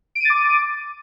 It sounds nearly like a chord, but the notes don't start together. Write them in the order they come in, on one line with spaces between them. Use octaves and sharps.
D7 D#7 A6 D6